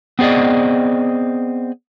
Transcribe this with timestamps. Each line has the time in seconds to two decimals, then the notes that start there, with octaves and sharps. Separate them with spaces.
0.19 B3 C4 G#4 D5 D#5